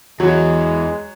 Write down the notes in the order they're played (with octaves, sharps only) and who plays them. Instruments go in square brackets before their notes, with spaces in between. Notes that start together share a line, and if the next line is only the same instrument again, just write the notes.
[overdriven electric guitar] E2 E3 [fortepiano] F#3 [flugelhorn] G#3